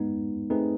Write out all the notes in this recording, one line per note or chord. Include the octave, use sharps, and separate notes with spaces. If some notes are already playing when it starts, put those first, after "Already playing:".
Already playing: G#3 B3 D#4
A3 C4 D#4 G#4 B4